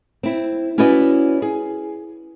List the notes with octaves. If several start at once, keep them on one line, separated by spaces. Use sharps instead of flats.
C4 E4
C#4 E4 F#4 B4 D5 D#5
G#4